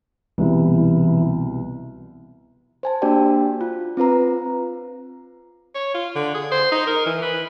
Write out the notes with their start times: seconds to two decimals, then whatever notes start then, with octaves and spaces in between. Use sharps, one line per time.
0.38 C2 B2 E3
2.83 C5 G#5 A5
3.02 A#3 D4 F#4 G4 D5 G5
3.61 F4
3.97 C4 F4 B4 A#5
5.75 C#5
5.94 F4
6.15 D3
6.34 G#4
6.51 C5
6.72 D#4
6.87 A#4
7.06 E3
7.22 B4